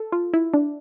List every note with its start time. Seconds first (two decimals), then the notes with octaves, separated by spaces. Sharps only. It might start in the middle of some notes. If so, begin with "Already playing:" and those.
Already playing: A4
0.12 F4
0.33 E4
0.54 D4